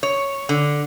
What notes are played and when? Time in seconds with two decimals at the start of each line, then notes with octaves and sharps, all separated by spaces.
0.03 C#5
0.49 D3